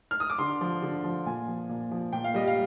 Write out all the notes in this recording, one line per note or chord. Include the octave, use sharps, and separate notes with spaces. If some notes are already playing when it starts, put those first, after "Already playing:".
F6
D#6
D6
D3 C6
F3
D3
F3
A#2 G#5
F3
A#2
F3
A#2 G5
F5
G3 D#5
F5